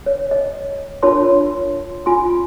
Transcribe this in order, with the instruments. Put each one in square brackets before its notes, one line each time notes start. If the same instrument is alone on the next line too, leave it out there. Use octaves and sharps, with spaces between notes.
[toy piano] C#5
D#5
D4 F4 A#4 C#5 A5 C6
F4 G#5 C6